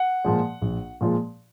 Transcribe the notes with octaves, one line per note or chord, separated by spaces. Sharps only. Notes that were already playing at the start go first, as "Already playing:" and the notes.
Already playing: F#5
A#2 F3 G#3
A#1
A#2 F3 G#3